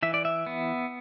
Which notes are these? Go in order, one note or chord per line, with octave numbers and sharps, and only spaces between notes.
E3 E5
D5
E5
B3